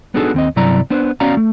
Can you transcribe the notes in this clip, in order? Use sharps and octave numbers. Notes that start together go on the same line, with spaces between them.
B3 D4 D#4 F#4 G#4 A4
D#2 C4 D#5
G2 C3 F#3 E4 D5 A#5
B3 D4 C5
B3 C#4 F#4 D5 F5 A#5
A3